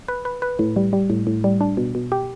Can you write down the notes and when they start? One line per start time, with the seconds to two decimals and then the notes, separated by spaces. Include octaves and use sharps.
0.08 B4
0.25 B4
0.42 B4
0.59 A2
0.76 G3
0.93 G3
1.10 A2
1.27 A2
1.44 G3
1.61 D4
1.77 B2
1.95 B2
2.12 G4